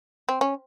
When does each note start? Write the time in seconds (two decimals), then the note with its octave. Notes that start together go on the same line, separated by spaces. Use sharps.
0.29 C4
0.41 C#4